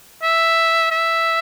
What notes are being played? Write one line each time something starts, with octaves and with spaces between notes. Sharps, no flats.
E5
E5